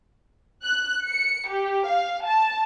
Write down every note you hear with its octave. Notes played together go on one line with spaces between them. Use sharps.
F#6
C#7
G4
F5
A5